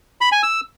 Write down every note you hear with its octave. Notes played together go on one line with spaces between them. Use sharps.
B5
G#5
E6